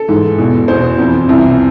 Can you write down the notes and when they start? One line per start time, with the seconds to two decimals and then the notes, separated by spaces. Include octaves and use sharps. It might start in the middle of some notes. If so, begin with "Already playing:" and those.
Already playing: A4
0.08 G#2 E3
0.38 E2 B2
0.68 E2 B2 C5
0.98 F2 E3
1.28 C2 C3 E3